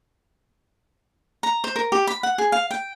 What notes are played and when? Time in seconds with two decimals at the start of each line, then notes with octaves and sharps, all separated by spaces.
1.43 A#5
1.64 C5
1.76 A#4
1.92 G4
2.07 B5
2.23 F#5
2.38 G#4
2.52 F5
2.71 G5